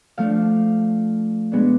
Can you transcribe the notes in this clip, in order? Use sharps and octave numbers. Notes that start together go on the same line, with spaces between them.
F3 A3 D4 F5
B2 G#3 B3 D4